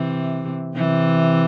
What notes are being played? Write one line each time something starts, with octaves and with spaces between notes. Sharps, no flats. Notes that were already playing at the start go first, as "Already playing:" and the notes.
Already playing: C3 E3
C3 E3